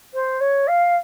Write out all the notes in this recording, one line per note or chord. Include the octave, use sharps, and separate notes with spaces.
C5
C#5
F5